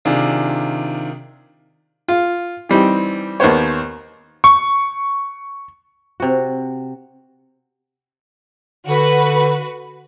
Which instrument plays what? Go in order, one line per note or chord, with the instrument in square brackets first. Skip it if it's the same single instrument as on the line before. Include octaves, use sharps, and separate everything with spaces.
[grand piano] C3 D#3 D4 F4 G#4
[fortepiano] F4
E3 G3 C4 D#4
D#2 A#3 B3 C5 C#5
[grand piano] C#6
[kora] C3 F#4
[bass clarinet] D3 [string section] F#4 B4